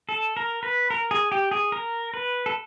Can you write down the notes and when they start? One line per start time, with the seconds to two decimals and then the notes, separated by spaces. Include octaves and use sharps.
0.09 A4
0.37 A#4
0.63 B4
0.90 A#4
1.11 G#4
1.32 G4
1.51 G#4
1.72 A#4
2.14 B4
2.46 A4